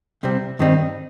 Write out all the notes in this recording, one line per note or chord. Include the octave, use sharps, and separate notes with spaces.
C2 C3 G3 C4
G2 D#3 G3 C4 D#4